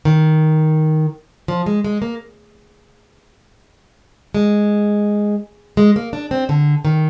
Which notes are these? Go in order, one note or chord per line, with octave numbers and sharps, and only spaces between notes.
D#3
F3
G#3
G#3
A#3
G#3
G#3
A#3
D4
C4
D3
D#3